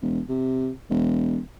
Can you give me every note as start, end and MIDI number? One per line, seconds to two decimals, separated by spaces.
0.02 0.20 28
0.29 0.70 48
0.90 1.39 28